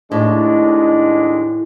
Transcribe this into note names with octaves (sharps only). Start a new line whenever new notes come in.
D#2 A2 G#3 D4